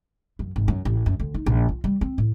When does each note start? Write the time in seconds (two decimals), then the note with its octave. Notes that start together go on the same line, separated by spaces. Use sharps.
0.39 F#2
0.56 G#1
0.68 F#2
0.85 A1
1.06 F#2
1.20 D2
1.34 D#4
1.46 A#1
1.69 F4
1.84 G3
2.01 C4
2.18 A2